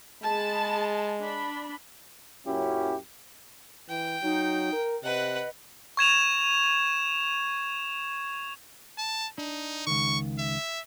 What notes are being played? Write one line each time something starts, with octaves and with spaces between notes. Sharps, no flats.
G#3 G#4 A5 B5
D4 B5
F#2 A#2 F#3 C#4 E4 G4
E3 G5
F#3 D#4
A#4
C3 B4 D#5 F#5
C#6 G#6 E7 F7
A5
D4 D#4
C#2 D#3 C#6
E5